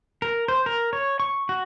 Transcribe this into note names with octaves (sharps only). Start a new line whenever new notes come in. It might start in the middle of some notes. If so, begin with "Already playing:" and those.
A#4
C5
A#4
C#5
C#6
F#4